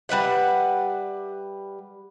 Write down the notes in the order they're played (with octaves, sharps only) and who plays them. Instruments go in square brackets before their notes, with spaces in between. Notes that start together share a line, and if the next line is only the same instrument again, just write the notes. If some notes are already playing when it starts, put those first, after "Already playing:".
[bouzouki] G3 B4 E5 F#5